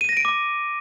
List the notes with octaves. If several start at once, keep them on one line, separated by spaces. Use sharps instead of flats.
D#7
A#6
D7
D6